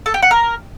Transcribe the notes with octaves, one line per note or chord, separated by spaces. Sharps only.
A4
G4
F#5
A#4